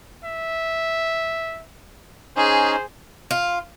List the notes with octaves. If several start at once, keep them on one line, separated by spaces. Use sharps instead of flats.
E5
C#4 D#4 G#4 C5
F4